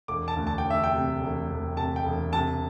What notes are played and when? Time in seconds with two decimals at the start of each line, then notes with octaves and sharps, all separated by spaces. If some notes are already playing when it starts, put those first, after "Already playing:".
0.08 E1 D6
0.28 A5
0.37 D2
0.47 A5
0.58 G5
0.65 D2
0.70 E5
0.84 G5
0.93 C3
1.21 E1
1.49 E1
1.77 C3 A5
1.96 G5
2.05 E1
2.33 C3 A5